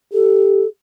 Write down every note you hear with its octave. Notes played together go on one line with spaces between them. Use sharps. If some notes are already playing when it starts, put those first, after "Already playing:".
G4 A4